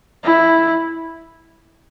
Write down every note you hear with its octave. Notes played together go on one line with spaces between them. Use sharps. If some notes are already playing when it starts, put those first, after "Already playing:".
E4